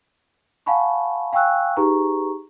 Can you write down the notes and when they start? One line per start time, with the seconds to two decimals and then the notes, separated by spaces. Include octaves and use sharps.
0.66 F5 F#5 G#5 A5 B5 C#6
1.33 F5 G5 G#5 C#6 E6 F#6
1.77 D#4 G4 G#4 B4 A#5 C#6